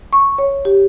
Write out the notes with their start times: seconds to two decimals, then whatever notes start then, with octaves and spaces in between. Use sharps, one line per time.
0.13 C#6
0.38 C#5
0.65 G4